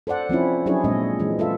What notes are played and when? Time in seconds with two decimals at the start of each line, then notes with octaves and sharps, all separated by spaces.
0.07 A4 C5 D5 F#5
0.29 F3 C4 C#4 E4
0.66 F#3 C#4 D4 E4 G#4 C#5
0.84 A#2 G#3 C4 D#5
1.19 E3 G#3
1.39 F4 A4 E5